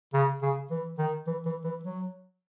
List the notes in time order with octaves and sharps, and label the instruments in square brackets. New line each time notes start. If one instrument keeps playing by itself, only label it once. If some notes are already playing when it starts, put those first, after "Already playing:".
[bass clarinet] C#3
C#3
E3
D#3
E3
E3
E3
F#3